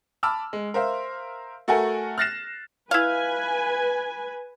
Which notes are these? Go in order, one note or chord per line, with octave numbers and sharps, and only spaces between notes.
A5 B5 D6 E6 F6
G#3
A#4 C5 E5 F5
A3 F#4 A4 A#4 F#5 G#5
F6 F#6 A6 A#6 C7 E7
E4 B4 F5 G#5